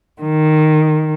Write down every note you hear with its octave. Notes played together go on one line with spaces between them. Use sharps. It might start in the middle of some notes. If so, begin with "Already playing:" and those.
D#3